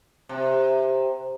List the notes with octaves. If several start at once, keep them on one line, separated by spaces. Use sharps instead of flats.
C3